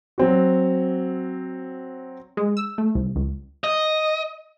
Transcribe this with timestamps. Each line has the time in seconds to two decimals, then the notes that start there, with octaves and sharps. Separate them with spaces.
0.18 F#3 C4 F#4
2.37 G#3
2.57 E6
2.78 A3
2.95 C2
3.16 C#2
3.64 D#5